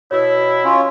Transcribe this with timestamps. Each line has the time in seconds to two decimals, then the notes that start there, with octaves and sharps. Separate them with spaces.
0.11 B2 E4 C#5
0.64 C#4 F4